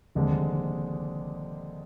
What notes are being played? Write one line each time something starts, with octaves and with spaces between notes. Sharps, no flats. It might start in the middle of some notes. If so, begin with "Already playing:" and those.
F1 D#2 D3 G#3